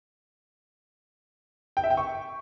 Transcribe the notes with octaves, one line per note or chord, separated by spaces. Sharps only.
G5
E5
G5
C#6